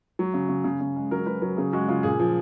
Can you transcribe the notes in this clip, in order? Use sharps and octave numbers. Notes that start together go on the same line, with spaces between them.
F#3
C#3
C#3
C#3
C#3
G#3
F#3 A#4
F#3 B4
F#3 A#4
C#3 G#4
G#3 F#4
C#3 F4
A#2 G#4
F3